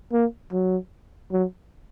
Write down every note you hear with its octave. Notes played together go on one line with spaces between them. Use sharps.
A#3
F#3
F#3